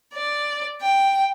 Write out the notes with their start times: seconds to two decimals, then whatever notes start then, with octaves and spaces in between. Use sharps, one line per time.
0.13 D5
0.80 G5